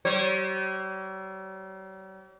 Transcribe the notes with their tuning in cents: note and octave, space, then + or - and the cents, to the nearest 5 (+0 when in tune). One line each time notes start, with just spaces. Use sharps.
G3 -45 C#5 -40